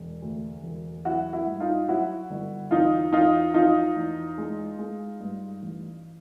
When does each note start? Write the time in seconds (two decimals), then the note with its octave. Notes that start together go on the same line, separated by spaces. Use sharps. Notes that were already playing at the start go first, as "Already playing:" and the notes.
Already playing: E1
0.22 D2
0.63 E1
1.05 F#3 E4 F#4
1.33 E4 F#4
1.46 G2
1.60 D#4 F4
1.88 F#3 E4 F#4
2.30 G1
2.71 E2 D#4 F4
3.12 E2 D#4 F4
3.54 F3 D#4 F4
3.96 E2
4.38 G#3
4.79 G#3
5.20 G2
5.63 A1